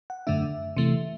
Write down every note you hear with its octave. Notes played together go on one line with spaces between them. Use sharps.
F#5
F#2 D3 A3 D4 E5
C3 E3 A3